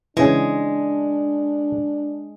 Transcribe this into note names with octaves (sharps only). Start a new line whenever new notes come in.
C#3 E3 G#3 D4